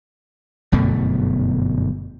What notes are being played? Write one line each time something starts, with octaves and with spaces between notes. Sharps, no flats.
G1 F#2 B2 A3